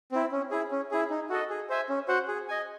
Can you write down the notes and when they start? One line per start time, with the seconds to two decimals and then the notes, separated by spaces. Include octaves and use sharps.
0.12 C4 E4
0.32 C#4
0.51 E4 G#4
0.71 C#4
0.91 E4 G#4
1.10 D#4
1.30 F#4 A4 D#5
1.50 G#4
1.70 C5 E5 G#5
1.89 C#4
2.08 F#4 C5 F#5
2.28 G#4
2.49 D#5 G#5